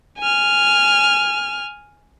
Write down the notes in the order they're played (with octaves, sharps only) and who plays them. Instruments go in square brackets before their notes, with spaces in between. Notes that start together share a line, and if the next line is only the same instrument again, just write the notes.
[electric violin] G#5 F6